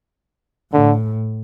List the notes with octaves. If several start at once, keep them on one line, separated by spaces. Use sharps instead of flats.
A2 D3